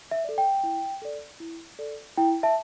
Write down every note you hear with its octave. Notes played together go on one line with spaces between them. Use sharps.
E5
A4 D5
G5
E4
A4 D5
E4
A4 D5
E4 G5
E5 A5